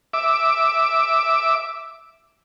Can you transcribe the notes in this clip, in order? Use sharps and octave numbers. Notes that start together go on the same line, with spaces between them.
E5 D6